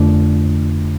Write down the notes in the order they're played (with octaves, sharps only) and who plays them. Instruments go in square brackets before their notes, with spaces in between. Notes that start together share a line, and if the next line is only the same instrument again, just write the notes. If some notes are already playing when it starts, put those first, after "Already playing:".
Already playing: [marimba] F2 D3 A3 D4